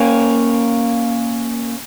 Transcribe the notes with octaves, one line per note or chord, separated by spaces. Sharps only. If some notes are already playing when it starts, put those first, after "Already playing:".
Already playing: A#3 C#4